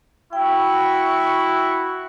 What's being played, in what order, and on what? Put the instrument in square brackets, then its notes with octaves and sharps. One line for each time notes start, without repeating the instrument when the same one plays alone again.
[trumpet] E4 [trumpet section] F#4 C#6 [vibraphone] G5